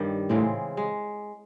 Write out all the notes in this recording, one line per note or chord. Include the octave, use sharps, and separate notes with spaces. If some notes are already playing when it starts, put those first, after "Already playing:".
Already playing: G2 D#3 G3 C#4
A2 C#3 E3 G#3 C4
G#3